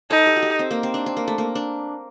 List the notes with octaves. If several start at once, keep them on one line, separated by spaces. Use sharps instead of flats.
D#4 A4
G4
F#4
G4
C4
A#3
C4
D4
C4
A#3
A3
A#3
D4